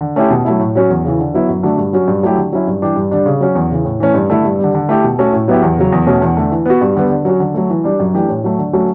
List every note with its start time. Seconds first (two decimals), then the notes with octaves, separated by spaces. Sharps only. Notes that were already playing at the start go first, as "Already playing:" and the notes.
0.01 D3
0.16 A3 C#4 E4 G4
0.31 B2
0.45 F#3 A3 E4
0.60 A2
0.75 F#3 C#4 F#4
0.90 E2
1.05 C#3 E3
1.19 D3
1.34 F#3 B3 E4
1.49 F#2
1.63 D3 A3 D4 F#4
1.78 G2
1.93 F#3 C#4 F#4
2.08 G2
2.23 F#3 A3 E4 G4
2.37 D3
2.53 F#3 C#4 E4
2.67 G2
2.82 E3 G3 D4 G4
2.96 G2
3.11 D3 G3 D4
3.26 C#3
3.40 F#3 C#4 F#4
3.55 E2
3.71 C#3 E3
3.85 A2
4.00 E3 A3 C#4
4.14 G2
4.30 D3 A3 E4
4.45 G2
4.59 D3 G3
4.75 D3
4.89 A3 E4 G4
5.04 B2
5.19 A3 C#4 F#4
5.32 A2
5.48 F#3 B3 E4 G4
5.62 E2
5.78 C#3 F#3
5.92 E2
6.06 B2 A3 C#4 F#4
6.22 E2
6.37 D3 A3
6.52 E3
6.66 B3 F#4
6.81 G2
6.96 D3 G3 B3
7.10 D3
7.25 F#3 C#4 F#4
7.40 D3
7.54 F#3 A3
7.70 E3
7.84 G3 D4
8.00 F#2
8.14 E3 A3 D4 G4
8.29 A2
8.44 F#3 A3
8.58 D3
8.73 F#3 A3 C#4 F#4